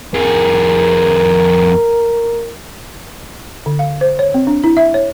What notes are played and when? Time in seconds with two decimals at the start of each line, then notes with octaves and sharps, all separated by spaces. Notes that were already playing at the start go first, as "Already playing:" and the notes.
0.14 F2 G#4 A#4
3.66 D3
3.79 F5
4.01 C5
4.19 C#5
4.34 C4
4.47 D4
4.64 E4
4.77 E5
4.94 C#5